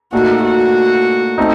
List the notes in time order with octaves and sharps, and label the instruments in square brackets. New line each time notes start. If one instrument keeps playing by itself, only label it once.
[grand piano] A#2 A3 D#4 A4 [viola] F#4
[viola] F#4
[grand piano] A3 C4 D#4